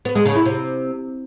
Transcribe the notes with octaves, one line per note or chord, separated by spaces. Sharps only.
B3
G#3
C#3
E4
C3